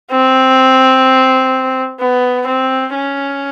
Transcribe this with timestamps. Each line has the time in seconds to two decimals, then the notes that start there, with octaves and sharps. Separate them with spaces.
0.11 C4
2.00 B3
2.47 C4
2.95 C#4